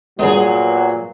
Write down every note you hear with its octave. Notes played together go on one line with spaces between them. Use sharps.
G2 A#2 D3 F#3 G#3 B3 G#4